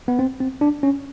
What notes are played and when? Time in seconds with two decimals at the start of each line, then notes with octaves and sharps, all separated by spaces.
0.08 B3
0.19 C4
0.40 C4
0.61 D4
0.83 C#4